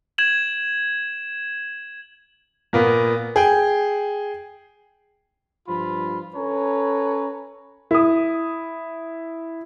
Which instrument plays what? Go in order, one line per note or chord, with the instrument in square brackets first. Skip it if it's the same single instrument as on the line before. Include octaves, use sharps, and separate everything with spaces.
[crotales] G#6 E7 F#7
[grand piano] A#2 A#3 B3
G#4 G5
[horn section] G2 F3 F4 B5
C#4 A4 B4 C#5 G#5 A#5
[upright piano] E4 D#6